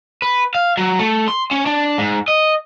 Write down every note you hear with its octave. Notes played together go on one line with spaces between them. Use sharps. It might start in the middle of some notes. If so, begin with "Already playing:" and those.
B4
F5
F#3
A3
C6
C#4
D4
G#2
D#5